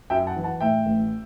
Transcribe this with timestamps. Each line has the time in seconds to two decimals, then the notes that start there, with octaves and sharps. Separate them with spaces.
0.10 F#2 E5 G5
0.27 F#5 A5
0.35 E3
0.44 F#5 A5
0.61 A2 E5 G5
0.86 A1